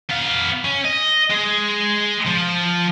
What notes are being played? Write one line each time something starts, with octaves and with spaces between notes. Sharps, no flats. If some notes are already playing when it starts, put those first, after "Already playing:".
B3 F5
C#4
D#5
G#3 G#4
F3